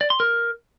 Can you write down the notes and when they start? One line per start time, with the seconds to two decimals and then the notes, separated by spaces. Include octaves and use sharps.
0.01 D5
0.10 C6
0.20 A#4